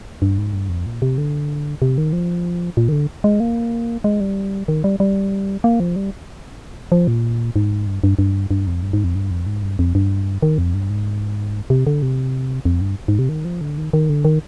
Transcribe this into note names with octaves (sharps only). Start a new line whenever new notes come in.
G2
G#2
G2
F2
A#2
C3
D3
C3
D#3
F3
A#2
D#3
D3
G#3
A#3
G#3
G3
D#3
G3
G3
A#3
F3
G3
F3
A#2
G#2
G2
G2
G2
G2
F2
G2
G#2
F2
G2
F2
G#2
G2
F2
G2
D#3
F2
G2
G#2
C3
D3
C3
F2
G2
G#2
C3
D#3
F3
D3
D#3
D#3
D3
D#3